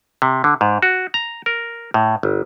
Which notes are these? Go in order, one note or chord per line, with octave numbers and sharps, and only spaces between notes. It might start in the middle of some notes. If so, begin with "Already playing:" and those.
C3
D3
G#2
F#4
A#5
A#4
A2
G1